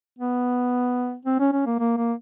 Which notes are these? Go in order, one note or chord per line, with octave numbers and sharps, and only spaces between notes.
B3
C4
C#4
C#4
A#3
A#3
A#3